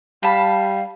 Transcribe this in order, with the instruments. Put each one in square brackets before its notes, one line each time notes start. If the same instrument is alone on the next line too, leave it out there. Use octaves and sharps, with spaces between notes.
[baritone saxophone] G3 [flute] F5 [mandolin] A5 B5